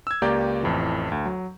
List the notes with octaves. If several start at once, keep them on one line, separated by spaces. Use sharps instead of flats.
E6 G#6
C#2 A#3 G4 D5 A#5 G6
A1 F2 E3
D2
F#3